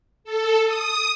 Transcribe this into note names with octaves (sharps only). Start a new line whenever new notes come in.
A4
D#6